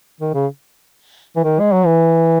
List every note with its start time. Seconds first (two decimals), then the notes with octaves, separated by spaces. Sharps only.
0.21 D#3
0.34 C#3
1.36 E3
1.44 D#3
1.60 G#3
1.73 F#3
1.85 E3